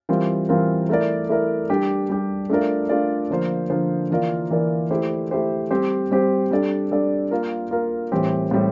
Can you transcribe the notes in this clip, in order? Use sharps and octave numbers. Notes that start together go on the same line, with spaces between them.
E3 G3 C4 F4 A#4
E3 G3 C4 F4 A#4
A3 E4 A#4 D5
A3 E4 A#4 D5
G3 D4 G4
G3 D4 G4
A3 D4 F4 A#4 D5
A3 D4 F4 A#4 D5
D3 F3 A#3 F4 C5
D3 F3 A#3 F4 C5
E3 A#3 F4 A#4 D5
E3 A#3 F4 A#4 D5
A3 E4 G4 C5
A3 E4 G4 C5
G3 C4 G4 C5
G3 C4 G4 C5
G3 D4 A4 D5
G3 D4 A4 D5
A#3 F4 A#4
A#3 F4 A#4
A2 E3 G3 C4 G4
A2 E3 G3 C4 G4